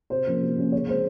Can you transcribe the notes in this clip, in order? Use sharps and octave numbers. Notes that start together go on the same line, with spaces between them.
C3 C5
F3 A#3 C#4
C3
F3 A#3 C#4
C#3 C#5
G#3 C4 C5